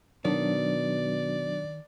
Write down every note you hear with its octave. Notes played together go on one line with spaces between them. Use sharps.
B2 D#3 F#3 D4 D5